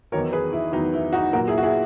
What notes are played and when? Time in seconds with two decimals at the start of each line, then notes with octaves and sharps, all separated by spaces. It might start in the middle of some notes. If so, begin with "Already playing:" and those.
0.12 E2 D#3 F#3 A#4 C#5
0.33 G#4 B4
0.53 E4
0.73 E2 D#3 F#3 D#4
0.94 E4
1.13 D#4 F#4
1.33 A#2 F#3 F#4 A#4
1.48 E4 G#4
1.58 F#4
1.63 E4 G#4